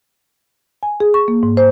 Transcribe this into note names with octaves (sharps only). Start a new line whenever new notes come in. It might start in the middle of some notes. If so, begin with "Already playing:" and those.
G#5
G#4
C#6
A#3
G#2
C5